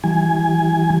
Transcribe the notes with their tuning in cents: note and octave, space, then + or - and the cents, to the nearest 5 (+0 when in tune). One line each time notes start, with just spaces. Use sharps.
E3 +0 G3 -25 G#5 +0